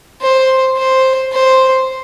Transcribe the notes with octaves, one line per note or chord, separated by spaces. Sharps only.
C5
C5
C5